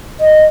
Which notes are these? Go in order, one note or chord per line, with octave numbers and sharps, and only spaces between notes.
D#5